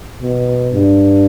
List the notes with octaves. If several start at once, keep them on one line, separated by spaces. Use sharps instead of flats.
B2
G2